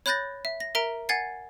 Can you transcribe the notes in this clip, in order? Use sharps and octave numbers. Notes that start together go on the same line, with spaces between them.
C#5 B5 F#6 G6 A6 A#6
E5
A#6
A#4 E5 A#5 D7
F#5 G#5 G#6 A6 C7